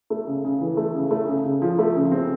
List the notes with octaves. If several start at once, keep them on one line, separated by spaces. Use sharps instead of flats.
A3
C#3
C#3
E3
A3
C#3
A3
C#3
C#3
F3
A3
C#3
C4